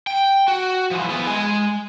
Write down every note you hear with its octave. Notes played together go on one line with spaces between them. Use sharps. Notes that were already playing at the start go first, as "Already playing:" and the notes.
G5
F#4
E3 F3
E3 B3
G#3 G#5